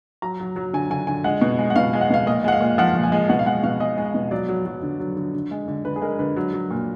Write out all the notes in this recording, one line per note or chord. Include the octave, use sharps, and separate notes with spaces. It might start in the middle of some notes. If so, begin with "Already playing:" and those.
F#3 A#5
F#3
F#3
D3 G#5
D3 G#5
D3 G#5
G#3 F#5
B2
G#3
F#5
B2 F5
G#3
F#5
B2 F5
A#2 D#5
G#3 F#5
F5
A#2
F3 F#5
A#2
G#5
G#3
B2 F#5
F5
G#3 F#5
B2 F5
G#3 D#5
G#3
B2
F#3 D5
F#3
F#3
D3
F#3
D3
D3
G#3
D3
D3 B4
G#4
G#3 A#4
D3 B4
F#3
F#3
A#2